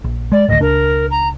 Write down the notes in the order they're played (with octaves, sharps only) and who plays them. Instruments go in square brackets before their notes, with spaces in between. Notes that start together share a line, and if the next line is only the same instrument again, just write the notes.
[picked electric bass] A#1
[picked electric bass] G#3 [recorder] D5
[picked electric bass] G#1 D2 A2 [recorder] D#5
[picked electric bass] C#2 D4 [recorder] A#4
[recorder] A#5